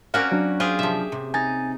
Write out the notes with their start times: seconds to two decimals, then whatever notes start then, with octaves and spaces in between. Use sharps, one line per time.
0.14 A#3 C4 C#4 F#4 D5 F5
0.32 F#3 D4
0.60 F4 G4 G#4 C5
0.79 C3 F3 E5
1.12 C3
1.34 D#4 G#5 A6